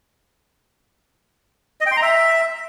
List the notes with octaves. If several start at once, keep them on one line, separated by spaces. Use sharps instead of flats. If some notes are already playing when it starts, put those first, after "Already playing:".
D#5
G5
C6
A#5
E5